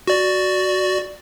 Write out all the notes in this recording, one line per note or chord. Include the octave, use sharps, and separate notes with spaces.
F#4 D5